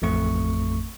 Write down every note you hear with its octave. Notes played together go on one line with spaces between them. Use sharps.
A1 F2 A3 C#6